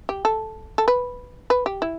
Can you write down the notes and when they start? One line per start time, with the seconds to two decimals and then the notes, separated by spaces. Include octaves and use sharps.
0.09 G4
0.25 A4
0.78 A4
0.88 B4
1.50 B4
1.66 G4
1.82 E4